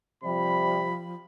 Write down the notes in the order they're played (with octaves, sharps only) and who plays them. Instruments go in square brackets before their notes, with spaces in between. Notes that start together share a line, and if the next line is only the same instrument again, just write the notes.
[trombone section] C3 G3 [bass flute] F3 [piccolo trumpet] B5